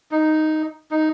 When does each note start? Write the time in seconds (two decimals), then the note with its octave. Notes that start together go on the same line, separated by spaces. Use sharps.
0.11 D#4
0.91 D#4